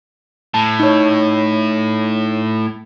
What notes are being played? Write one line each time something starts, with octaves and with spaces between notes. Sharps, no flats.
A2 A5
D#4 C#5